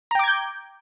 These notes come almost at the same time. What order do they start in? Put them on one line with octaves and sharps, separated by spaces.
A#5 G5 D6 G#6 G6